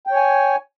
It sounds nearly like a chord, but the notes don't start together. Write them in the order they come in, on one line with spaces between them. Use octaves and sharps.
G5 C#5 G#5